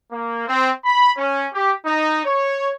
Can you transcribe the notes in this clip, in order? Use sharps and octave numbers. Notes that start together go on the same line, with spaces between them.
A#3
C4
B5
C#4
G4
D#4
C#5